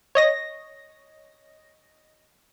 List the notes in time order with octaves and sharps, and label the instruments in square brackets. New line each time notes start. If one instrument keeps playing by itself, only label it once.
[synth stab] C#5 D#5 A#6